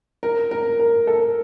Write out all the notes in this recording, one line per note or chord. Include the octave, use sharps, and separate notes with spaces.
A#4
A#4
A#4
A4